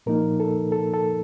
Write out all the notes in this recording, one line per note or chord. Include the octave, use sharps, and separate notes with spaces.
A#2 F3 A#3 D#4 A#4
A4
A4
A4